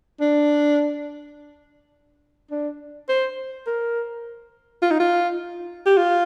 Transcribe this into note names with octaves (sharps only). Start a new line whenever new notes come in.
D4
D4
C5
A#4
F4
D#4
F4
G4
F4